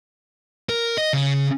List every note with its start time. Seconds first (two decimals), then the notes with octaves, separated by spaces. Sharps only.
0.69 A#4
0.98 D#5
1.13 C#3